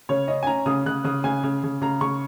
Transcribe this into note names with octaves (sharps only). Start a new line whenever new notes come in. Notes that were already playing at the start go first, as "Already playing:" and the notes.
C#3 C#5
C#4 D#5
G#5
C#4 A#5
C#3 D#6
C#3 F#6
C#3 D#6
C#3 G#5
C#3
C#3
C#3 A#5
C#3 C#6